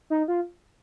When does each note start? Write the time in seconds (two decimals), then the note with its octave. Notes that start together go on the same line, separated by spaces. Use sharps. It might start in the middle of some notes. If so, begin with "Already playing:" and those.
0.10 D#4
0.28 F4